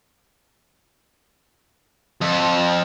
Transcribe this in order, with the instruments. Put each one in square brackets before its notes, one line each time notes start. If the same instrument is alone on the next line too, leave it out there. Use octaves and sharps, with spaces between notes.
[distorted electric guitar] F2